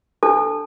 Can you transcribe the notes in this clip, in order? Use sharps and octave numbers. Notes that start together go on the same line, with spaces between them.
D4 A4 A5